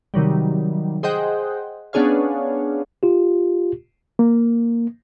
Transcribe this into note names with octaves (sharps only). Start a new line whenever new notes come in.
C3 D#3 F#3 G3
G#4 C5 D#5 F#5 G5
B3 C#4 D4 G#4 C#5 F5
F4 G4
A#3